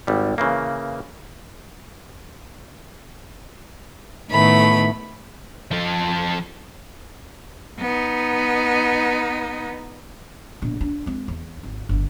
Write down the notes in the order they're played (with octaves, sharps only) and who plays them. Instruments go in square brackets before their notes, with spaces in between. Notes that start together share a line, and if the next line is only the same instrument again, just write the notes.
[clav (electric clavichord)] G#1 G3
C#3 E3 A#3
[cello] A2 [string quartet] D#3 A3 B3 [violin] B5
[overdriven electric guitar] F3 A4
[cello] B3 D#4
[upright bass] A#1 B2
D4
G#3 C4
E2
G#1
G1 G2